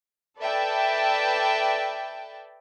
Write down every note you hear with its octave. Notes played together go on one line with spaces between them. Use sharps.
A4 B4 D5 E5 G5 A5